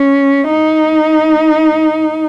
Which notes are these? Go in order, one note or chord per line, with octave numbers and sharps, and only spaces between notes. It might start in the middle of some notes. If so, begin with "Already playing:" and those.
Already playing: C#4
D#4